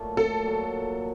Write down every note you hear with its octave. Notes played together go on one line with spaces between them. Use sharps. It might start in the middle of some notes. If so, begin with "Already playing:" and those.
Already playing: A#2 F#3 A3
A4
A#2 F#3